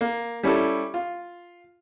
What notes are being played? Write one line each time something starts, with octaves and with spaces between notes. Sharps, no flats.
A#3
G3 C#4 E4 A4
F4